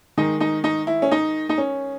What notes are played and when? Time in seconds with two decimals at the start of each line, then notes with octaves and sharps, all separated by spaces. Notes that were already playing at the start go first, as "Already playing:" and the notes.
0.17 D#3 G#3 D#4
0.40 D#4
0.64 D#4
0.87 E4
1.02 C#4
1.11 D#4
1.49 D#4
1.58 C#4